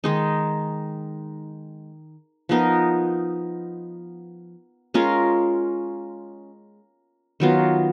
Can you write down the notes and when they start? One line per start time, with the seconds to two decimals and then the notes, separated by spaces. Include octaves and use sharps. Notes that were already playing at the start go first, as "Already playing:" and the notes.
0.04 D#3 G#3 D#4
2.49 F3 B3 D#4 A#4
4.94 G#3 C#4 F4 A#4
7.40 D#3 F#3 B3 F4